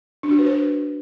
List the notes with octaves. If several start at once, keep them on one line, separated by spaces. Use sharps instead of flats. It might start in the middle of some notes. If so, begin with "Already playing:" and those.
D4
F#4
B4
C5